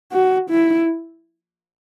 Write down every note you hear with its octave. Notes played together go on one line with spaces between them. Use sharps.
F#4
E4